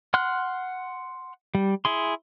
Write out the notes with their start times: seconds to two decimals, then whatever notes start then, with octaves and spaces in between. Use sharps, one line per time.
0.14 F#5 C6 F6 F#6
1.55 G3
1.85 E4 G#4 C6